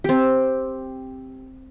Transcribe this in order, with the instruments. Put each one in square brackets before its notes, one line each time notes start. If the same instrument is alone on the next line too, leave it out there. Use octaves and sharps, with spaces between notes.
[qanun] C4 G4